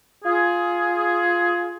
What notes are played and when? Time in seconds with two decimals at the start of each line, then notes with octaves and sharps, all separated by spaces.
0.25 F4 G#4